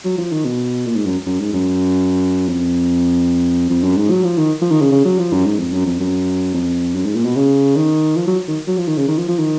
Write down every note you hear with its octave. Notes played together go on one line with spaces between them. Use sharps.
F#3
F3
D#3
B2
A#2
G#2
F#2
F#2
G#2
F#2
F2
F2
F#2
G#2
F#3
F3
D#3
F3
D#3
C#3
C#3
F#3
F3
F#2
G#2
F2
F#2
F2
F#2
F2
F#2
G#2
A#2
B2
C#3
D#3
F3
F#3
D#3
F#3
F3
D#3
C#3
D#3
F3
F3
D#3